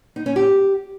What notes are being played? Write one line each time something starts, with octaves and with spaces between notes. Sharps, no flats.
D#4
C#4
G4